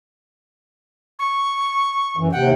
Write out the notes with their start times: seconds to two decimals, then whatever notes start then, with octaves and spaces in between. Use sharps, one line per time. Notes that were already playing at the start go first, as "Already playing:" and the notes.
1.19 C#6
2.17 F#2 E3
2.32 D#2 C3 F#5 G5